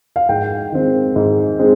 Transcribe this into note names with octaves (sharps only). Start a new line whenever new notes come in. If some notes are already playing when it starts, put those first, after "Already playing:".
F5
G#2 G5
D#3 G#3 C4
G#2
G#3 C4